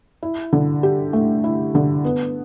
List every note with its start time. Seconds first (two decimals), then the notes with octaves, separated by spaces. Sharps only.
0.23 E4
0.53 D3
0.83 G4
1.13 A3
1.44 E4
1.75 D3
2.04 B3